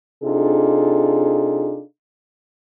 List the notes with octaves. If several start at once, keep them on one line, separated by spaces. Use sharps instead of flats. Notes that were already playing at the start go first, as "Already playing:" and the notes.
C3 D4 D#4 F4 G#4 A4